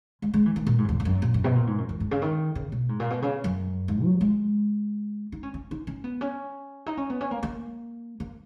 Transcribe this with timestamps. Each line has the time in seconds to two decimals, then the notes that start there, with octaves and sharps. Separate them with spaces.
0.22 G#3
0.34 G#3
0.46 E3
0.56 D#3
0.67 A#2
0.78 G#2
0.85 F#2
0.89 E2
1.00 E2
1.05 F#2
1.22 A#2
1.34 F#2
1.44 B2
1.56 A#2
1.67 G#2
1.78 F#2
1.89 E2
2.00 G#2
2.11 C#3
2.22 D#3
2.55 C#3
2.72 B2
2.89 G#2
3.00 A#2
3.10 B2
3.22 C#3
3.44 F#2
3.88 G#2
4.04 F#3
4.21 G#3
5.32 D#4
5.43 C#4
5.54 C#4
5.71 D#4
5.87 C#4
6.04 B3
6.21 C#4
6.86 D#4
6.97 C#4
7.10 B3
7.21 C#4
7.31 A#3
7.43 A#3
8.20 A#3